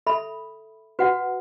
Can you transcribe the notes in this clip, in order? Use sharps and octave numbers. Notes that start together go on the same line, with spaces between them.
A4 E5 B5
F#4 B4 F#5